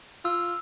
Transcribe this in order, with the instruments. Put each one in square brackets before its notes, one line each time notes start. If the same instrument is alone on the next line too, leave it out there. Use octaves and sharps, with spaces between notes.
[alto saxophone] F4 [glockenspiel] E6